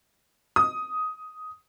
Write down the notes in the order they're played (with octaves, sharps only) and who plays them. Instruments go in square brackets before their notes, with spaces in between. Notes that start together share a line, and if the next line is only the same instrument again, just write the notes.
[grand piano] D#6